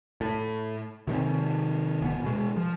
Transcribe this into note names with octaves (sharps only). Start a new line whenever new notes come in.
A2
C3 D#3 A#3 C4
D1 B3
B2 G#3
F3